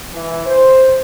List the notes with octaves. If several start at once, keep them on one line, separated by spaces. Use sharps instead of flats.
E3
C5